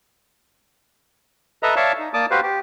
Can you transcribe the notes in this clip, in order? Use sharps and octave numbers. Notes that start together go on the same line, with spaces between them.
A4 B4 D#5 E5 A#5
C#5 D5 E5 F5 A5
D#4
A#3 D5 A5 D6 D#6
F#4 G4 B4 C5 F5
G4